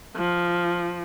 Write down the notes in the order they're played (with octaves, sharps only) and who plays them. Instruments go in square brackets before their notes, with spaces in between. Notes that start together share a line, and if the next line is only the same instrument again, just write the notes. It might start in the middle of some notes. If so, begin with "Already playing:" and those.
[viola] F3